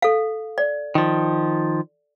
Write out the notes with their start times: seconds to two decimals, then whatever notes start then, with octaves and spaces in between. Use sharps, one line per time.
0.02 A4 F5
0.58 D5
0.95 D#3 F3